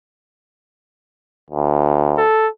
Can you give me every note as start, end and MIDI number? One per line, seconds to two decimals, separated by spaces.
1.50 2.22 38
2.18 2.48 69